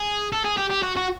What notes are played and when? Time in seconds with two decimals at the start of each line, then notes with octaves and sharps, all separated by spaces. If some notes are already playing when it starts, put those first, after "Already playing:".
Already playing: G#4
0.32 A4
0.44 G#4
0.57 G4
0.70 G4
0.83 F#4
0.96 F#4